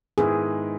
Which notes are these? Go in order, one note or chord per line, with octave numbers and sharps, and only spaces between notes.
G#2 D#3 G#3 B3 E4 G#4